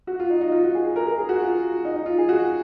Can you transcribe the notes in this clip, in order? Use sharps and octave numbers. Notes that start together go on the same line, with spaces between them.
F#4
F4
D#4
D#4
F4
F#4
G#4
G#4
A#4
A#4
G#4
F#4
F4
D#4
D#4
F4
G#4
F#4